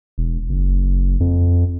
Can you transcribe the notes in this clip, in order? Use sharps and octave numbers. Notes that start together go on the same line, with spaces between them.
E1
F#1
F2